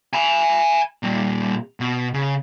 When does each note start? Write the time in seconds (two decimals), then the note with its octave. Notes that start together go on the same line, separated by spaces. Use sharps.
0.14 G#5 B5
1.03 A#2 G3
1.80 B2
2.14 C#3